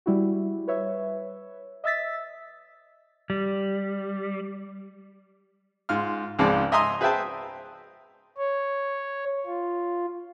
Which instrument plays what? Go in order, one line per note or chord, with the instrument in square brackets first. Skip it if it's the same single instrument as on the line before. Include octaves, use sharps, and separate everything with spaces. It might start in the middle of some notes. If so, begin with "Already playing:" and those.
[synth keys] G3 E4 F#4
B4 C#5 E5
D#5 E5 E6 A6 B6
[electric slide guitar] G3
[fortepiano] G#2 F4 F6
C#2 G#2 F3 G#3 C4 D5
D#5 E5 G#5 A#5 C6 D#6
G#4 B4 C5 E5 G5 A5
[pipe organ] C#5
F4